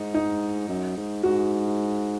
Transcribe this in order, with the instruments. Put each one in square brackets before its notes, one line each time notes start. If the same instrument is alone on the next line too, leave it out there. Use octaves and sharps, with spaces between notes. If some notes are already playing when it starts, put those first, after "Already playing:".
Already playing: [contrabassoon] G#2 [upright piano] D#4
[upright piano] D#4
[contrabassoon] F#2
G#2
[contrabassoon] G#2 [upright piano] F#4